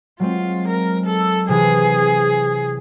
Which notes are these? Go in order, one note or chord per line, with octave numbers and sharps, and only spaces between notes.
F#3 G#3 C4 F4
A#4
A4
C3 E3 G#4